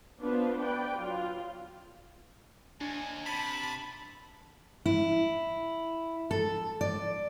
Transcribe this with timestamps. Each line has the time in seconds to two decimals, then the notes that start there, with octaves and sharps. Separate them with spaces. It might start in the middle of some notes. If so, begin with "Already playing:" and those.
0.20 B3 D4 F4 B4 C5
0.61 B4 D5 G5
0.95 F#3 F4
2.81 D#2 D4 G#5
3.26 C3 A5 B5
4.86 E4
6.31 A4
6.81 D5